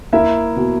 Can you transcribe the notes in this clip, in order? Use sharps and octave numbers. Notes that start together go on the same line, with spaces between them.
A#3 E4 E5
B2